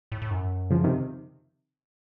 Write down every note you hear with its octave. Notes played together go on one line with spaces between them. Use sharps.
A2
A2
F#2
C#3 F3
C3 D#3